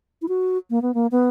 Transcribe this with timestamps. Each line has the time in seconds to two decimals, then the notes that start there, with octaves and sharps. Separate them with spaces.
0.22 E4
0.29 F#4
0.70 A#3
0.82 B3
0.94 A#3
1.12 B3